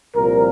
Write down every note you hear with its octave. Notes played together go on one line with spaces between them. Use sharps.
C2 A#2 F3 A#3 A#4